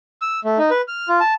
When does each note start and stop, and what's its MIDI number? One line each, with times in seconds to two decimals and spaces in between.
0.22 0.40 88
0.45 0.58 57
0.58 0.70 63
0.71 0.82 71
0.88 1.08 89
1.08 1.20 65
1.20 1.34 81